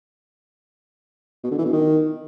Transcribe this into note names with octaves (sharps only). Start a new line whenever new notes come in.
B2
D3
E3
B2
D#3